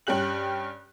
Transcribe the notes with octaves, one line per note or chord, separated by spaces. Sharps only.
G2 G3 C#4 G4 F#6 F#7